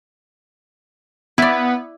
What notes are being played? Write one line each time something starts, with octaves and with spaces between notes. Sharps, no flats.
B3 E4 D5